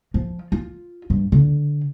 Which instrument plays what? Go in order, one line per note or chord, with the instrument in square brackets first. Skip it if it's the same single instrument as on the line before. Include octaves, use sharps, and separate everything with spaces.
[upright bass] F3
F4
G2
D3